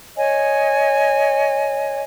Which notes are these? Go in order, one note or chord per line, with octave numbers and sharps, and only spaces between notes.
C#5 D#5 G#5